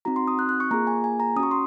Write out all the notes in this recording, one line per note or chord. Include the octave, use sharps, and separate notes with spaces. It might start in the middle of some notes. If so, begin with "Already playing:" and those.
C4 D#4 F#4 A#5
C6
D#6
F#6
F#6
C#6
A#3 F4 G#4 A#5
G#5
G#5
A#5
C#4 F#4 C#6 D#6
C6